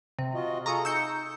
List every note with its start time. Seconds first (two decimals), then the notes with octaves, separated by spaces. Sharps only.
0.19 C3
0.34 F4 F#4 D#5
0.66 F4 G#4 A4 A#5 C#6 D#6
0.85 D#4 E6 G6 C#7